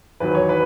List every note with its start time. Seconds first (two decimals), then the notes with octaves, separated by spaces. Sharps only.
0.20 E2 D#3 F#3 B4
0.35 C#5
0.49 B4